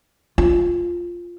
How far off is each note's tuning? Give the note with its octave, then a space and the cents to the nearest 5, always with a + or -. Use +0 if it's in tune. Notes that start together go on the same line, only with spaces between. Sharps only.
F4 +0